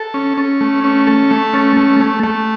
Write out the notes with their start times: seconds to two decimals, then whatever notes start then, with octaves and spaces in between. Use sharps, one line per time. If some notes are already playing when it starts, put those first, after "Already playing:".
Already playing: A4
0.14 C#4
0.37 C#4
0.61 A3
0.84 C#4
1.07 A4
1.31 A3
1.54 C#4
1.77 A3
2.00 A3
2.23 A3